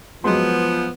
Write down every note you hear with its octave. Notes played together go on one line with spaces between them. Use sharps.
F3 F#3 G#3 B3 C6